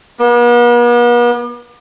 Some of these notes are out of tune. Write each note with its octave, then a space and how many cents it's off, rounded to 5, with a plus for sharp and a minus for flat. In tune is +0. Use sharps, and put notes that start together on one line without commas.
B3 -45